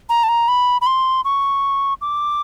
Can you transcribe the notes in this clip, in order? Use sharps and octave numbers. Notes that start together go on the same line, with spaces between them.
A#5
A5
A#5
B5
B5
C6
C#6
D6